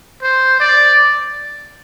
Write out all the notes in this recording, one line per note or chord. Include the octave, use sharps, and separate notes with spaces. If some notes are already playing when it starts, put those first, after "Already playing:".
C5
D5